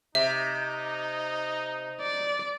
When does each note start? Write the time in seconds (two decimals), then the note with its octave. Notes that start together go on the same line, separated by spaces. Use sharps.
0.15 C3 D#4 E5
2.01 D5